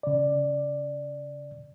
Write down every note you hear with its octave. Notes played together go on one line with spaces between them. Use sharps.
C#3 D5